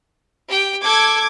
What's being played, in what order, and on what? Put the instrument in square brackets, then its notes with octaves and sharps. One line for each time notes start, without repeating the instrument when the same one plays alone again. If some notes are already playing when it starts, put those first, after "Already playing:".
[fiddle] G4 G5
[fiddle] A4 [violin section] D6 G#6